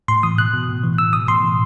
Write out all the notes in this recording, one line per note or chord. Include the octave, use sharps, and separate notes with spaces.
A2 C6
E3 D#6
B2 F#6
B2
A2
E3
B2 E6
B2 D#6
A2 C6
E3